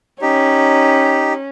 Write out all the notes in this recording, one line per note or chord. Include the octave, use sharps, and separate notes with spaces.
C#4 D#4 G4